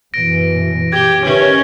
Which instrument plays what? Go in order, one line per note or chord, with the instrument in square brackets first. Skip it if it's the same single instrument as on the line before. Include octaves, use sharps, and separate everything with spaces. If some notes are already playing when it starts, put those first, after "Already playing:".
[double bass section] F#2 B2 E3 [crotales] A#6 D7
[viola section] G4 [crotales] G#6 G7
[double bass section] D#3 [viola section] C#4 [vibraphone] G4 B4 E5